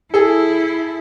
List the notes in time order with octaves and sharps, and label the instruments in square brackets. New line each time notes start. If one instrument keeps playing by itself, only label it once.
[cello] E4 [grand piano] G#4 A4